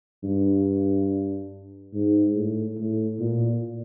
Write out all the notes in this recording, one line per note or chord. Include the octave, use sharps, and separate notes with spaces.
G2
G#2
A2
A2
A#2